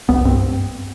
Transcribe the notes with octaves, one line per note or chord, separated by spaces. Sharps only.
C2 B3
G2 C4